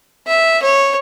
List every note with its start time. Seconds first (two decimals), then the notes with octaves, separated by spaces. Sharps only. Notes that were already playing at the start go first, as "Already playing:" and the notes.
0.27 E5
0.62 C#5